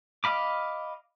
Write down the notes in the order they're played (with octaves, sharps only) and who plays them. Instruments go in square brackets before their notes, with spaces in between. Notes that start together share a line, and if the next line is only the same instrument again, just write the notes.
[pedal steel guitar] D#5 F5 B5 D6